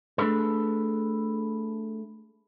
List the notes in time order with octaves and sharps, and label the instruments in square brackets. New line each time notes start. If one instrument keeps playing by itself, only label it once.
[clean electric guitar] A3 D4 G#4 A4 B4